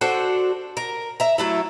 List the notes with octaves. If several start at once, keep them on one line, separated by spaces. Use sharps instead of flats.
D4 F#4 A4 C5
A#4
E5 A#5
F#3 A3 E4